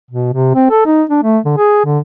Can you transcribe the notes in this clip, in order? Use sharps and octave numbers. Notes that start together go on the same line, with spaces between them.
B2
C3
C4
A4
D#4
D4
A3
D3
G#4
D3